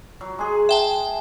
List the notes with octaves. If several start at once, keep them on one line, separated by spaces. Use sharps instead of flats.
F#3
G#3 G#4
E5 G5 A5